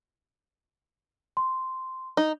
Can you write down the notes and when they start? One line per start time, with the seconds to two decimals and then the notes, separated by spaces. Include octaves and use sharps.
1.37 C6
2.17 D#4